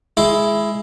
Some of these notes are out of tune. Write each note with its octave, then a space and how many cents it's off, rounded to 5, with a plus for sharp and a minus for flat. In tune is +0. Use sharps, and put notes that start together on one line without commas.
G#3 +10 E4 +5